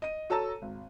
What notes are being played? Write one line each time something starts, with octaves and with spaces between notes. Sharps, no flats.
D#5 D#7
F#4 A4 C#5 A5 A#5 E6
G#1